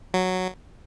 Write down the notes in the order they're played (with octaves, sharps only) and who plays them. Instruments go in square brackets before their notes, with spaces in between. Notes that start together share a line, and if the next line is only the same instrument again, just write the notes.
[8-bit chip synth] F#3